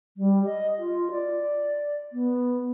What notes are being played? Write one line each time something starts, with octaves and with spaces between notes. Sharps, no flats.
G3
D#5
F4
D5
B3